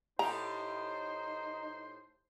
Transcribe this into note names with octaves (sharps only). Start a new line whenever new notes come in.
A2 D#4 G4 C5 A#5